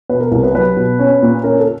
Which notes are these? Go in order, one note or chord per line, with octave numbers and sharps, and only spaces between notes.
B2 B4
A#4
C2 A#4
B4
F#3 B4
B2
C#4
A#2
C#4 A#4
A4